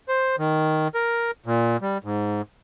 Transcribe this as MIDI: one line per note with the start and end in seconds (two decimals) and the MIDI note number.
0.08 0.36 72
0.39 0.88 51
0.95 1.31 70
1.46 1.77 46
1.82 1.98 55
2.04 2.42 44